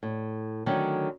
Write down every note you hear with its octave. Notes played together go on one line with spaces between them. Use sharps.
A2
D3 D#3 F#3 A3 C#4 D#4